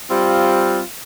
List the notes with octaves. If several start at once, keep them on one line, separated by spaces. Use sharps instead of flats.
G3 C4 F4